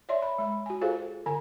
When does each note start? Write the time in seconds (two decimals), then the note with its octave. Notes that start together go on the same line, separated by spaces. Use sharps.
0.09 C#5 D5 E5 C6
0.22 B5
0.38 G#3 B5
0.66 F#4 G#5
0.81 F4 G#4 A4 C5 F5
1.26 D3 G#5